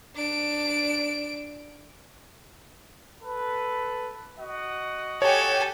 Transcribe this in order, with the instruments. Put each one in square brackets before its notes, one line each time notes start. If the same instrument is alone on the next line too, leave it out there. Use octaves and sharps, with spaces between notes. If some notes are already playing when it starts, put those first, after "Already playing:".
[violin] D4 D7
[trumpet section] A4 B4
F#4 D#5 F#5
[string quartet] G4 [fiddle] A4 G#5 [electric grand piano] C#5